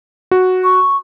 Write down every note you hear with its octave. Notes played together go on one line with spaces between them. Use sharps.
F#4
C#6